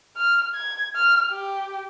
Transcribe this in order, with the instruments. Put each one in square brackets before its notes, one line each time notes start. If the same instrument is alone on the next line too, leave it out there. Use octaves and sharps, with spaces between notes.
[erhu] F6
G#6
F6
G4